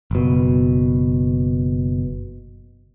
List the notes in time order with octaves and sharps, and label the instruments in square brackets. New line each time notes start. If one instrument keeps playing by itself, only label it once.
[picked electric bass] F#1 B2